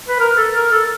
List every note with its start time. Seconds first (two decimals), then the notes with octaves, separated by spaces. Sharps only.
0.09 B4
0.20 A#4
0.37 A4
0.55 A#4
0.72 A4